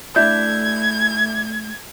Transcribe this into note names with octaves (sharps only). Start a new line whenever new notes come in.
A3 D4 E4 E5 G6 G#6